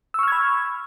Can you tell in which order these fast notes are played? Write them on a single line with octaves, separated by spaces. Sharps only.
E6 C#6 F6 G#6 B5